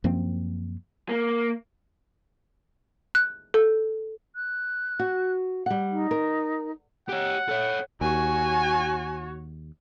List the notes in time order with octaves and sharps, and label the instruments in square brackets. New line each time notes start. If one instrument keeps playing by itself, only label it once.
[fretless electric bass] F#2 F3 A#3 C4
[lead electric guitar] A#3
[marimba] F#6
A4
[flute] F#6
[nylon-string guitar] F#4
G3 F#5
[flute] D#4
[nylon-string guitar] A#4
[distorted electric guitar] G4 C#5 [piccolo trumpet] F#5
[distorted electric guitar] A4 C#5
[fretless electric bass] D#2 [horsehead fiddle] F#4 C#5 [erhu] G#5